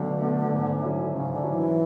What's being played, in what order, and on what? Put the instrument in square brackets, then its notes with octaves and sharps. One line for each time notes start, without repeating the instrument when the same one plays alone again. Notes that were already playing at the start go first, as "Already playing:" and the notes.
Already playing: [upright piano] B1 B2 A3 [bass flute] D3
[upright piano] B2 A3
G#2
F#3 C#4 E4
[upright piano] G#2 [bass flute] C#3
[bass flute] D3
[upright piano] F#3 C#4 E4
[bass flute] E3